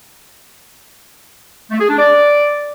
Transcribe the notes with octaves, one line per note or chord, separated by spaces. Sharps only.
A3
G#4
D4
D5